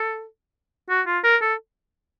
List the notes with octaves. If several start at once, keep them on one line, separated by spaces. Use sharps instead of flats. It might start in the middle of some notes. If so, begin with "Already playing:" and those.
Already playing: A4
F#4
F4
A#4
A4